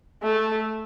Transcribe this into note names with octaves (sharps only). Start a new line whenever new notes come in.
A3